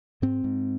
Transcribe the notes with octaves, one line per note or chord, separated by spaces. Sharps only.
G#2 C4
G#2